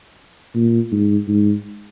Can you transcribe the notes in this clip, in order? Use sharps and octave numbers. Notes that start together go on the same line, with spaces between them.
A#2
G#2
G#2